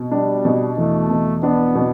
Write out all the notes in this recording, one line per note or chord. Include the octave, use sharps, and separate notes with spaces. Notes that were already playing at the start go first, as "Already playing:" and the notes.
Already playing: B2
G3 D4
B2
E2 A3
B2
B3 D4
B2